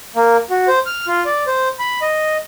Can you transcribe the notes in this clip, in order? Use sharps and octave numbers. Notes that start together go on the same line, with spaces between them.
A#3
F#4
C5
F6
F4
D5
C5
B5
D#5